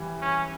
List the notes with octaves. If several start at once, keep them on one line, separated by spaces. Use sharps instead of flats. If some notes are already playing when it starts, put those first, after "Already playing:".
Already playing: E3 G3
C#4